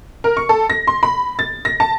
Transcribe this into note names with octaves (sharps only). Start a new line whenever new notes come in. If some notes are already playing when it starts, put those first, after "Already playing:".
A#4
C#6
A4
A#6
C6
B5
A6
A#6
A5